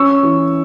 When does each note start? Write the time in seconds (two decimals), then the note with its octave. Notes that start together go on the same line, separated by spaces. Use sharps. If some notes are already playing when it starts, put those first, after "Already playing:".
Already playing: C#4 C#6 E6
0.23 E3